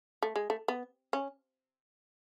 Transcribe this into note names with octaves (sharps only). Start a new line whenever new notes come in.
A3
G#3
A3
B3
C#4